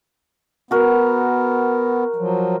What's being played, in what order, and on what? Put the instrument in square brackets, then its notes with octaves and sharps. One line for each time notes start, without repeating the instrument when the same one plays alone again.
[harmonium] B3 [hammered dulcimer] F#4 A#4
[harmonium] F3 F#3